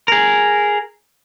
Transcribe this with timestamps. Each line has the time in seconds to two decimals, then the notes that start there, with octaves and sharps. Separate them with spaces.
0.08 G#4 A#4